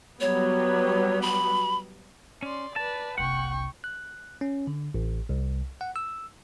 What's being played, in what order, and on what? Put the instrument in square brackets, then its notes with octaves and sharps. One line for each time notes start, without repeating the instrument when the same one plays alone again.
[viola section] F#3 G3 B3 [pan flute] C#5
[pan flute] B5
[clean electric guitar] C#4 [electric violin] D5 C6
[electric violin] B4 D5 [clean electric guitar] A5
[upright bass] F#1 C2 [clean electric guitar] F#5 [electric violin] G5 C#6
[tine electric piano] F#6
C#4
D3
A1
C2
F#5
E6